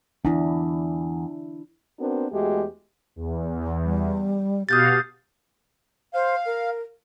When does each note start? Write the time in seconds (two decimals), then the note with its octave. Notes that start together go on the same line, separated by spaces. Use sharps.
0.25 E2 D4 E4
2.00 B3 C4 D4 F#4 A#4
2.32 E2 G#3 A3 F#4 G4
3.16 E2
3.84 G3
4.69 B2 F#4 G4 F5 D#6 G6 A6
6.14 C5 F5
6.45 A#4